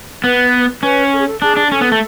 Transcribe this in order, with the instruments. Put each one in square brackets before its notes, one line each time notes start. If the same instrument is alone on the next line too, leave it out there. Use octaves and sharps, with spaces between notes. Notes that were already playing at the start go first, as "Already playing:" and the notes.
[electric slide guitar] B3 [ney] B4
[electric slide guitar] C#4 [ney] B4
[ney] A4
G#4
A4
[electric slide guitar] D4 [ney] G#4
[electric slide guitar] D4
[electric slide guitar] C#4 [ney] A4
[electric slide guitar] B3
A3